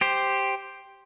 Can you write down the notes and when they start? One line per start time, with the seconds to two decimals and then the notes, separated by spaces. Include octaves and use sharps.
0.01 G4 C5